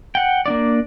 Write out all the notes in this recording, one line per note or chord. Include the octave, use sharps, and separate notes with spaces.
F#5 G5
A#3 D4 D5